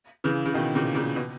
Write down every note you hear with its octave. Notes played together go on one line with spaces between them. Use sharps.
C#3 E3
C#3
B2 D#3
A#2 C#3
A#2 C#3
B2